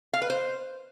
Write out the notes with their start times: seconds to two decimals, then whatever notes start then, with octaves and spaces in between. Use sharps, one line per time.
0.13 F5
0.22 B4
0.30 C5